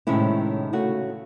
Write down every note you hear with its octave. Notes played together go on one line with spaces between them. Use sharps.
A2 C3 D#3 G#3 C#4 E4
C#3 A3 F#4